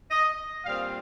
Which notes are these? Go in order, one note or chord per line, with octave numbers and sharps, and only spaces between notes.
D#5
A#2 G3 C4 F5